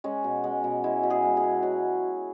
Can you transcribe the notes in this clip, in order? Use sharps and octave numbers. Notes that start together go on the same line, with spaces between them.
G#3 C#4
B2
G#3
B2
G#3 E4
B2
G#4
G#3
G#4
B2
F#3